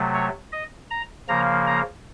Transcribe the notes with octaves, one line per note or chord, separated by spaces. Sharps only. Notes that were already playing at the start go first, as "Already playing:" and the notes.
Already playing: C3 F#3 A3
C#5
D#5
A#5
C#3 F3 A#3 A#5
A#5